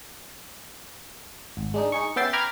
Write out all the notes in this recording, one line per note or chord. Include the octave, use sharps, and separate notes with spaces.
G#1
G#3 D4 D#4
D#4 G#4 C#6
B3 C#4 E5 G5 A6 C7
G5 A#5 B5 D6 F6 G#6